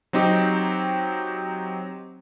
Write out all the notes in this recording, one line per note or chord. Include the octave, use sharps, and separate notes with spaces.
F#3 C4 D#4 G4